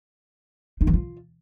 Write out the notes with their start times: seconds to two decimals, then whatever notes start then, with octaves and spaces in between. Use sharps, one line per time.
0.81 D#4
0.87 E3
0.93 F4